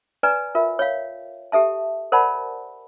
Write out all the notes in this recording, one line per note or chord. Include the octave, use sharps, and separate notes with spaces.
B4 D5 G#5 A#5
F4 A#4 E5
C#5 F5
G4 A4 E5 A5
A#4 C5 D5 F#5 A5 B5